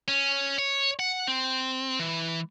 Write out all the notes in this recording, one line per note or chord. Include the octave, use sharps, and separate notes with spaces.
C#4
C#5
F#5
C4
E3